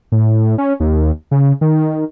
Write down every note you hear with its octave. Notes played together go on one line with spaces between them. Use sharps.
A2
C#4
D#2
C#3
D#3